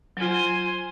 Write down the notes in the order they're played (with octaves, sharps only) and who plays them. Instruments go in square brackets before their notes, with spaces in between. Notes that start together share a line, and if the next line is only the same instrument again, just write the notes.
[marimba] F#3 F4 [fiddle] C5 G#5